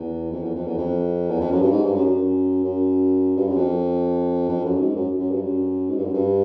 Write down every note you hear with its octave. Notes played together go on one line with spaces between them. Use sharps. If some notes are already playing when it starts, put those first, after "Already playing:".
Already playing: E2
F2
E2
F2
E2
F2
E2
F2
F#2
G2
G#2
G2
F#2
F#2
F#2
G2
F#2
F2
F2
F#2
G#2
F#2
F#2
G2
F#2
G#2
G2
F#2
G2